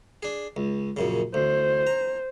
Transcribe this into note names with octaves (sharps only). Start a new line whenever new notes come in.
D4 G#4
C#2
A#1 F#2 C#3
D2 C5
A#5